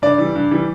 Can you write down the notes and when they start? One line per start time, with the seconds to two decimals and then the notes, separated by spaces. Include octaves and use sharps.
0.02 G2 D5
0.18 E3 G3
0.35 G2
0.51 E3 G3